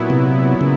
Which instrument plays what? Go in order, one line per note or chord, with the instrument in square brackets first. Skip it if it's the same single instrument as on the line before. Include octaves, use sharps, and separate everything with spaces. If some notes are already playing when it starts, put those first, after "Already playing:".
Already playing: [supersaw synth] A#2 F#3 B3 E4
[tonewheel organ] C3
C#3